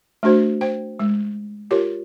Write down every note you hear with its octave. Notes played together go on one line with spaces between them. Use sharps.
A3 D4 F#4 C5
C5 G5
G#3
F4 G4 A#4 C#5